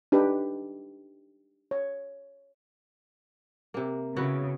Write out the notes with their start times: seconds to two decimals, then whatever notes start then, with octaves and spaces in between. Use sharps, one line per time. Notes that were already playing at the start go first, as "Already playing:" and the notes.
0.12 D4 D#4 G4 B4
1.71 C#5
3.74 C3 A#3
4.16 C#3 B3 E4 F#4